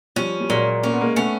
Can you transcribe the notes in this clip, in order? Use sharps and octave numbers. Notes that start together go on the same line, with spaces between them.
F3 G3 C#4
G3
A#2 F#3 G#3
A#3 C#4
B3
G#3 A#3
A3 B3 C#4